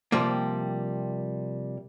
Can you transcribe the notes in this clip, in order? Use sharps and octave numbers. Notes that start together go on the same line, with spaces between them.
C3 F3 G3 A#3